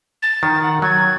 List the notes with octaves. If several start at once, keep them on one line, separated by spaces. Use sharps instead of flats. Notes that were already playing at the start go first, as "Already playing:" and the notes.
A6
D#3
F#5
F#3 G#6